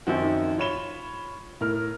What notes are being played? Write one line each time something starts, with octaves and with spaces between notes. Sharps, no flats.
F#2 D#3 F3 C4 D#4 F#4
F4 C#5 B5 E7 G7
A2 A#4 F6